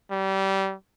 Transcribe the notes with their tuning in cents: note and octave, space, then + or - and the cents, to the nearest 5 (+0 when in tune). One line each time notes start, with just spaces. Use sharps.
G3 -25